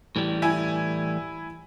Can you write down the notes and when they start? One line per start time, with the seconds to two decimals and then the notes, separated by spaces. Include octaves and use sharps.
0.16 A2 E3 G3
0.42 E4 G#5